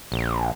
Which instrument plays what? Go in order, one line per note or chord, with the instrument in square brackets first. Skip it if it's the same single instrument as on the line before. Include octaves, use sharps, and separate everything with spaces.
[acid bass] A#1